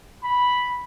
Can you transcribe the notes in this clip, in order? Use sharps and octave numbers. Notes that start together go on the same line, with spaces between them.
B5